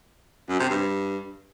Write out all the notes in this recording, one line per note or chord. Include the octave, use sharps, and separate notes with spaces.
F#2
C3
G2